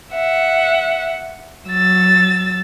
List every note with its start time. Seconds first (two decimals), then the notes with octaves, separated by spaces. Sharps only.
0.13 E5 F#5
1.67 F#3 E6 A6